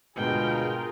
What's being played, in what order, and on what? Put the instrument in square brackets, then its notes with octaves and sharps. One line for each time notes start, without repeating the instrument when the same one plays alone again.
[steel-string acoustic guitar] D2 G#2 [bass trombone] B2 [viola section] F4 G#4 A#4 [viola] G5